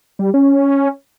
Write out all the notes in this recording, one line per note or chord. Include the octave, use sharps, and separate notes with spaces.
G3
C#4